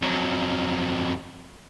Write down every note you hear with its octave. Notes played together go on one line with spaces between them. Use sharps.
F2 F#3